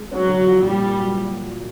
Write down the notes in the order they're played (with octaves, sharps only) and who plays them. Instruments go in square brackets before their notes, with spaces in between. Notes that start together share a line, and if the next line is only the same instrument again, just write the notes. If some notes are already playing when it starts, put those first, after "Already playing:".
Already playing: [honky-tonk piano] G#3
[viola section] F#3 [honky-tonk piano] C#4
[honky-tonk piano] D3
F3
[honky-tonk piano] A#2 [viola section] G3
[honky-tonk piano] A#2
F#3